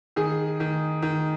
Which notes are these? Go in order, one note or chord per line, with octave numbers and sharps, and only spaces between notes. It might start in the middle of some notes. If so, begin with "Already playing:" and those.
D#3 G#4
D#3
D#3